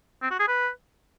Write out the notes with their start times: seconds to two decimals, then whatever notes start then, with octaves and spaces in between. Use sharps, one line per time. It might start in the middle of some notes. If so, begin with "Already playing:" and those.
0.22 C4
0.31 F#4
0.39 G#4
0.48 B4